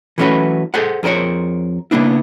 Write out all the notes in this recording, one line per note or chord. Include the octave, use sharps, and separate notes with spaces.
E3 F#3 A3 C#4 F#4 B4
G#4 A4 C5 F#5
F2 G#4 A#4 C5 C#5
C#3 A#3 B3 D4 E4